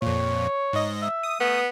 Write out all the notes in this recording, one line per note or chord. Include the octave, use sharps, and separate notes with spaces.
F2 A#2 C#5
G#2 D#5
E5
D#6
A3 B3